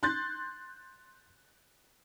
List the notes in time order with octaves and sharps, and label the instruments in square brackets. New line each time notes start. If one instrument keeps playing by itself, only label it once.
[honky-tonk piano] C6 F#6 G6 A6